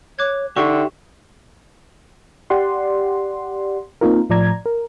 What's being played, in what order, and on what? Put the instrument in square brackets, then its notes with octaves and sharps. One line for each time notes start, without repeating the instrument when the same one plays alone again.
[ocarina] C#5 [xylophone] D6 F#6 G#6
[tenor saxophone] D3 [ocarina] D#4 [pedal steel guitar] G4 E5 C6 [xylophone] C#6
[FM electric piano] G4 D5 F#5 C6
A#3 C4 D#4 F4 A#4
A2 F3 D5 A#5 G#6
A#4